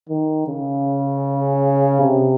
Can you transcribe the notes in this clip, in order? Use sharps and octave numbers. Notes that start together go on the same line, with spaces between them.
D#3
C#3
C3